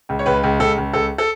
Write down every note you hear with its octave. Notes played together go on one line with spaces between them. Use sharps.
C#2
C#5
C#2 B4
C#2
C#2 A4
C#2
C#2 A4
A4